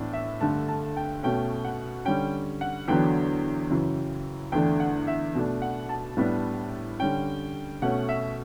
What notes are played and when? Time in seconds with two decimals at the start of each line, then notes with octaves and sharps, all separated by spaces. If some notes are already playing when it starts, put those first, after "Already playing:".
Already playing: A2 E3 B3 D4
0.13 E5
0.41 G2 D3 A3 A5
0.68 A5
0.97 G5
1.23 B2 A3 C#4 G5
1.65 F#5
2.05 D3 G3 C#4 G5
2.61 F#5
2.88 E2 D3 F#3 B3 D4 G5
3.70 F#2 C#3 E3
4.52 E2 D3 A3 D4 G5
4.80 F#5
5.07 E5
5.35 B2 A3 D4
5.62 F#5
5.89 A5
6.17 A2 G3 B3 D4
7.00 D3 G3 C#4 G5
7.82 B2 A3 C#4 F#5
8.09 E5